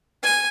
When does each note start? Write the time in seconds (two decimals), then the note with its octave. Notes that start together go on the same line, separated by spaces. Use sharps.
0.23 G#5